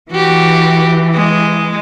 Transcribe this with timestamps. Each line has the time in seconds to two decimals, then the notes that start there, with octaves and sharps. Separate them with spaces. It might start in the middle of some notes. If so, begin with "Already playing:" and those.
0.12 E3 F#4 G4
1.14 G#3